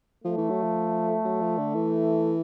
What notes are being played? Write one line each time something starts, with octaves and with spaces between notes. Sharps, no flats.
F3 A3
E3
F#3
F3
F#3
F3
D3
E3